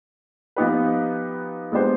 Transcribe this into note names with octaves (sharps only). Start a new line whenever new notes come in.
F3 B3 D#4 G4 B4
G#3 B3 D4 G4 C5